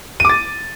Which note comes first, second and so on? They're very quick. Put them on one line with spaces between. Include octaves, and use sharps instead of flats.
D#7 D6 A6